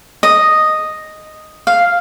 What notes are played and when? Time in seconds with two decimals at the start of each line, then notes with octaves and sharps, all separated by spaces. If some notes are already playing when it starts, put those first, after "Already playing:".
0.23 D#5
1.67 F5